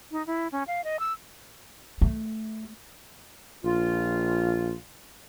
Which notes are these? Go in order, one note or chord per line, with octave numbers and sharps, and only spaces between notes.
D#4
E4
C#4
F5
D#5
E6
A3
A#1 F4